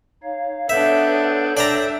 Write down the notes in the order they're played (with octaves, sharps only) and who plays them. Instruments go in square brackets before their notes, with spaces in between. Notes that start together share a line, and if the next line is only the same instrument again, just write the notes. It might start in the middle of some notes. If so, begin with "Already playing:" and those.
[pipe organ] D#4 C#5 F5
[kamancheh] B3 D4 [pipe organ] A4 C#5 G6 [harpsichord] E5
[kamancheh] D4 E5 [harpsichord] D5 G5 A#5